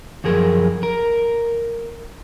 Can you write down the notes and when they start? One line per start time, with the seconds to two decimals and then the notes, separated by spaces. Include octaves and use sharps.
0.24 F#2 F3 G#4 A#4
0.83 A#4